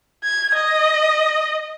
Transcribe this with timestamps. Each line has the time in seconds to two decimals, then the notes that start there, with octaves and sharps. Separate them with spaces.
0.24 G#6
0.55 D#5